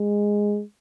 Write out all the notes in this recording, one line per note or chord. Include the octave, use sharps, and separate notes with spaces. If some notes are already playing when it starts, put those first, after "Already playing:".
Already playing: G#3